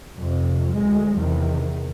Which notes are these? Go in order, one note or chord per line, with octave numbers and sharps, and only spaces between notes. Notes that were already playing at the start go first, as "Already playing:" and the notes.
F2 C3
D2 G#3
E2 C3 D#3